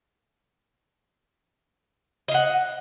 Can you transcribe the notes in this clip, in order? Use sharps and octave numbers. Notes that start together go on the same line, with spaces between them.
D#5 F5 F#5